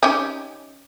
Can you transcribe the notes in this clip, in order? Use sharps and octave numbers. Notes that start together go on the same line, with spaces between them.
C#4 D#4 G4